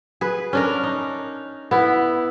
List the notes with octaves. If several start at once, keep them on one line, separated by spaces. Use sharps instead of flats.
G#4 B4
C#4 D4 A#4
D#4
B3 E4